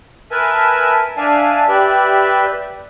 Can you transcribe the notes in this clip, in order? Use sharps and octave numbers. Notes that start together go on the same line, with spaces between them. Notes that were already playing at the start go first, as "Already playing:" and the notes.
A#4 B4 E5 G#5 A5
D4 D5 E5 F5 G#5 A5
G4 B4 D5 E5